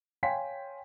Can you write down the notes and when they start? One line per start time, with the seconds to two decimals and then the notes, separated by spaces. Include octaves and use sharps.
0.23 C#5 F5 G5 G#5 C6 B6